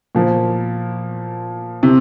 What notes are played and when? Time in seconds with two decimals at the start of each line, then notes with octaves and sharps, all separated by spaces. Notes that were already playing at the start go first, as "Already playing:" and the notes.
0.15 A#2 F3 A#3
1.83 C3